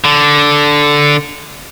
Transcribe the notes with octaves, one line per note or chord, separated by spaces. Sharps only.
D3